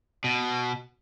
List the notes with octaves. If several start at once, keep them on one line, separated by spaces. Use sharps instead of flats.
B2